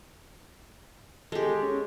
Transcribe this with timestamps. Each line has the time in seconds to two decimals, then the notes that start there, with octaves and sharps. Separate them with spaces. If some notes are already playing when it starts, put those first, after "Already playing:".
1.32 G#3 G4 A4
1.63 C#4